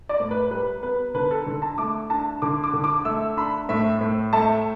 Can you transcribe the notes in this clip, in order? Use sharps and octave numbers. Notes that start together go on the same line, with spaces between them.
D5
A2
B4
G3 B4
B3 B4
D3 B4
A4
D3
A5
A3 D6
D4 A5
D3 D6
D6
D3
D6
A3 E6
D4 B5
A2 E5
A2
A3 A5